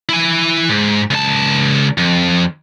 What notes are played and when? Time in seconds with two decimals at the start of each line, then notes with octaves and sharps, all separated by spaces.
0.09 E4 G#5
0.69 G#2
1.11 C#2 A5
1.98 F2